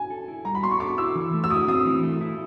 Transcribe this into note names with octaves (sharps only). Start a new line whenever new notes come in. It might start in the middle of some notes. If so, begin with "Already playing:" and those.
Already playing: G#5
A4
E4
G3 A#5
B5
B3 C6
C#6
A4 D6
E4 E6
E3
A3
E6
E4 D#6
C4 D#6
E3
A3
E4